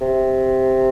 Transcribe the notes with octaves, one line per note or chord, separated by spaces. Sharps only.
C3